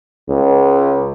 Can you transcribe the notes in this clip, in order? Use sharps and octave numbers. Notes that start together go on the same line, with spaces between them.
C#2